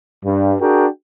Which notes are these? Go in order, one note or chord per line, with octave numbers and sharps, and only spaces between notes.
G2
D4 F#4 G#4 A#4 G5